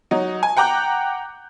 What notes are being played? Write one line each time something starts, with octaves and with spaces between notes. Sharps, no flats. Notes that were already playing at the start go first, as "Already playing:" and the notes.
F#3 D#4
G#5
F#5 G5 A#5 D6 F#6 G6